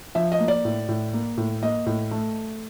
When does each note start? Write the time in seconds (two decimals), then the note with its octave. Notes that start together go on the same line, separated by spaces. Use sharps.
0.15 F3 E5
0.32 D#5
0.39 A#3
0.48 D5
0.65 A2
0.88 A2
1.13 A#3
1.37 A2
1.62 A#3 D#5
1.86 A2
2.11 A3